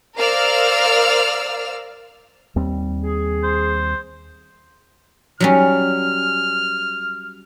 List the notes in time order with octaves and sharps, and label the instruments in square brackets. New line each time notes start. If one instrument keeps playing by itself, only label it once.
[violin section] A#4 C5 D5 F5 E6 F6
[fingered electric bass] D#2 G3 C4
[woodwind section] G#4
[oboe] C5
[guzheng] F#3 G3 C#4 [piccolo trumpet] F6